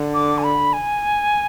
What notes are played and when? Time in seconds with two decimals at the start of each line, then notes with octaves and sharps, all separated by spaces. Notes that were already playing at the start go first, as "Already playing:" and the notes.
Already playing: D3
0.14 D6
0.38 G#5
0.44 B5
0.73 G#5